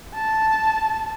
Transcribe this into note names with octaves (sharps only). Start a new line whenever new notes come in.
A5